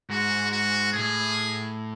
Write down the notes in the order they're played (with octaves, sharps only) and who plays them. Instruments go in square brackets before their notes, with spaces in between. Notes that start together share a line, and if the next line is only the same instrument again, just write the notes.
[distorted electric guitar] G#2 [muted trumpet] F#4
[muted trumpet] F#4
[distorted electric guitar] A2 [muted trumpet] G#4